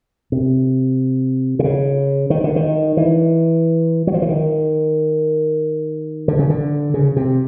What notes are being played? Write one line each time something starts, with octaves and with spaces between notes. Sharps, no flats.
C3
C3
C#3
D#3
D3
D#3
E3
F#3
F3
E3
D#3
D3
C#3
D3
C#3
C3